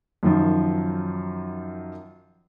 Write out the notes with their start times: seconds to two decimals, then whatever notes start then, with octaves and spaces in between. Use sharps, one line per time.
0.23 F#2 D#3 F3